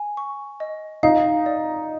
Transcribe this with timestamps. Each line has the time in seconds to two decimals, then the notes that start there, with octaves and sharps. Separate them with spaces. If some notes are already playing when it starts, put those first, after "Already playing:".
Already playing: G#5
0.17 C#6
0.60 D#5
1.03 D#4 F5
1.46 D5